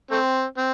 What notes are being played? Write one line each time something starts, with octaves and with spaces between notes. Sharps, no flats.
A3 C4
C4